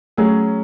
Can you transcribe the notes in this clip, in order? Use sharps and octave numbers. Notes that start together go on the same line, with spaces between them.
F#3 A3 C#4 G#4